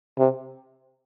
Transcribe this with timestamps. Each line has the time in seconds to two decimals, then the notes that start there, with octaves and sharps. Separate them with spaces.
0.19 C3